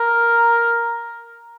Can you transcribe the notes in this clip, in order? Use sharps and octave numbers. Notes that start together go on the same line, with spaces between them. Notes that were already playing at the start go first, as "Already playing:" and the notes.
Already playing: A#4